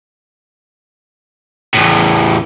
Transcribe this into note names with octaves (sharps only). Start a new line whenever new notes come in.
E2 A2